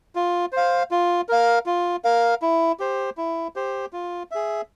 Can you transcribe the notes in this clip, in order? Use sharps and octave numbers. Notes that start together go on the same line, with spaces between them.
F4
C5 F5
F4
A#4 F5
F4
A#4 F5
E4
G4 C5
E4
G4 C5
F4
G#4 E5